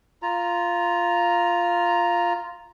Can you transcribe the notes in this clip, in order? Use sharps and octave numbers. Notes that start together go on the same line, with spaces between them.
F4 A#5